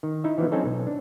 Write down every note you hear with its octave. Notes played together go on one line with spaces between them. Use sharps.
D#3
D#4 E4 E5
E3 F3 B3
F#3 C4 C#4 D#4 A4 C#5
B1
D4